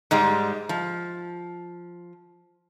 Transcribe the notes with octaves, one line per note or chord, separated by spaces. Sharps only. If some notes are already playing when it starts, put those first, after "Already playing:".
G#2 G3 G#3
F3